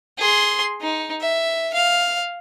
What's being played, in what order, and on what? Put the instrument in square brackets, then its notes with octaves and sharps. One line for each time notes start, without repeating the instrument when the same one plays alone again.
[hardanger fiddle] G#4 C6
D#4
E5
F5